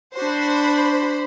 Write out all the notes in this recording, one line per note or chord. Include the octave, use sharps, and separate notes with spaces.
D4 F#4 C5 B5